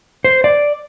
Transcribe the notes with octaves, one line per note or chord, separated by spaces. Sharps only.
C5
D5